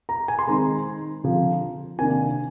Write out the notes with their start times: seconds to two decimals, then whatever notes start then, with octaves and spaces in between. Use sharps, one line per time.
0.09 A#5
0.28 G#5
0.39 C6
0.47 D#3 G#3 C4 D#4 A#5
1.24 D3 F3 C4
1.98 C3 D#3 A#3 D4 G#5